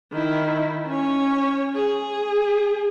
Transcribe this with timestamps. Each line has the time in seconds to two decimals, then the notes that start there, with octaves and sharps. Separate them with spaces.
0.12 D#3 E4
0.88 C#4 C#5
1.75 G#4